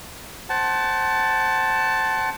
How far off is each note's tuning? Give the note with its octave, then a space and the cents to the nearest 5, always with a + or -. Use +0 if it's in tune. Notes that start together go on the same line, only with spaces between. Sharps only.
C5 +15 F#5 +35 A5 +0